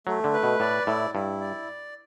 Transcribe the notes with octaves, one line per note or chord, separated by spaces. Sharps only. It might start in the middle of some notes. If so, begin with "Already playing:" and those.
F#3 A3
D3
B4
B2
A2 D5
A2 E4
G2 E4
D5